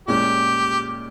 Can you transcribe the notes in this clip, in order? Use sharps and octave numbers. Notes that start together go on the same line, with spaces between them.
A#2 G#3 C#4 G4